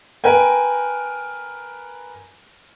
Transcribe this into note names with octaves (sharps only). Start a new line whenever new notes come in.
A#4 B4 G5 G#5